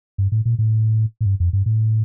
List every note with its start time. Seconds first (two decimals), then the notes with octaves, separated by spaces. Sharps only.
0.18 G2
0.32 A2
0.45 A#2
0.59 A2
1.21 A2
1.26 G2
1.40 F2
1.53 G2
1.66 A2